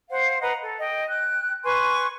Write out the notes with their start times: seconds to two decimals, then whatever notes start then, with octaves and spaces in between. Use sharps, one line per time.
0.09 C5 F5 F#5
0.41 B4 D#5 F#5 A#5
0.61 A4
0.80 D#5 G5
1.08 G5 F#6
1.64 B4 G#5 C6 C#6